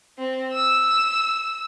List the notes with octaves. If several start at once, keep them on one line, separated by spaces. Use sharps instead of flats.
C4
E6